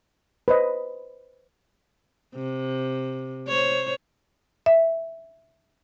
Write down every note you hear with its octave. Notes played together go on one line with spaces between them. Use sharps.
B4 C5 D#5
C3
C5 C#5
E5